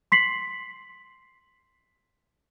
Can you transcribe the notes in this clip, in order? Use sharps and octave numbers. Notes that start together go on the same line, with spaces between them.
C6 B6 C7 F#7